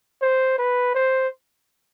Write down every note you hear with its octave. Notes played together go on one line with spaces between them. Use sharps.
C5
B4
C5